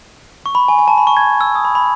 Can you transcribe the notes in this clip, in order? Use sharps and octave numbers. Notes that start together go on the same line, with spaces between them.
C#6
B5
G#5
G#5
A5
B5
C#6
G#6
E6
D#6
B5
B5